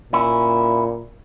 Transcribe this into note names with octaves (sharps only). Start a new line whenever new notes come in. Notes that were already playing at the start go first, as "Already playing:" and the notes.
A#2 C#4 E4